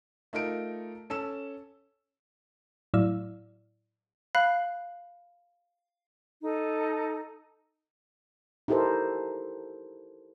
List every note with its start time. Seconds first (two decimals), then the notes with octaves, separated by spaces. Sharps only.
0.33 A3 D#4 F4 A#4 D7
1.10 C#4 A4 E6 E7
2.94 A2 F#3 E4 D5 F5 E6
4.35 F5 B5 F#6 C7
6.42 D#4 A4
8.68 D#4 E4 G4 A4 A#4 C5